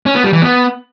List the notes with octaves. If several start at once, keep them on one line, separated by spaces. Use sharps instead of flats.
C#4
B3
G3
E3
B3